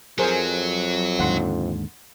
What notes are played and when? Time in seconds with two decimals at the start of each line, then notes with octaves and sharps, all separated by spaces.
0.19 F2 F#3 G#4 A#4 C5
1.19 D#2 G#2 D3 F#5 C6